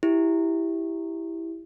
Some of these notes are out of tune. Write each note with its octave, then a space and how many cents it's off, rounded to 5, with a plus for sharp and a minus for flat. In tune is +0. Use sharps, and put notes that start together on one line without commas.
E4 +0 G4 +0